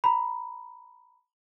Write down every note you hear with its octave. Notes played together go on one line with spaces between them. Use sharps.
A#5 B5